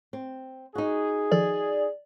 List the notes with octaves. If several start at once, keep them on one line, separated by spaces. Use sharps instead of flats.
C4
D#4 F#4 G#4
D#3 F3 A4 D5